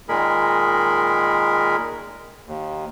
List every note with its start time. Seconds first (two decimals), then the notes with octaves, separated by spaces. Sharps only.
0.09 A#2 D#3 G#3 G#4 A#4 B5
2.48 D#2